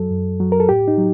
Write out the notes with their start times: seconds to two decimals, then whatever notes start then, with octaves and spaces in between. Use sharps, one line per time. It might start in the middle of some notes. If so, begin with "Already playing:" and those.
Already playing: F#2 F#3 A4
0.11 F#2
0.40 F#3
0.52 A#4
0.60 A4
0.69 A2 G4
0.88 D#4
0.98 F#3